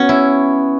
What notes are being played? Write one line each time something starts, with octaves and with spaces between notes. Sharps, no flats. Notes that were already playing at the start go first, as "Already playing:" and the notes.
Already playing: B3 C#4 F#4
E4